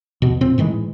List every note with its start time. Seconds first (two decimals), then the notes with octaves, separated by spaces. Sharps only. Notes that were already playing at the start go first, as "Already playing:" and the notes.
0.22 E2 B2
0.41 A#2 C4
0.58 A2 D#3 E3 G#3